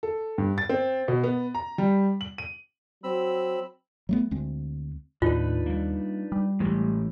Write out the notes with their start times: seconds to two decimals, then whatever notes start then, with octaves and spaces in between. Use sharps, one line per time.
0.03 A4
0.38 G2
0.58 A6
0.69 C4
1.08 B2
1.23 B3
1.55 A#5
1.78 G3
2.21 F#7
2.38 D#7
3.04 F#3 C4 B5 E6
4.09 F#3 A3 B3
4.31 D2 G#3 C4
5.22 D#2 A2 D4 D#4 F4 B4
5.66 G3 A#3
6.32 G3
6.60 A1 A2 E3 G#3 G4